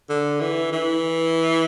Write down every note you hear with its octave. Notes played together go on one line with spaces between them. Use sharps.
D3
E3
E3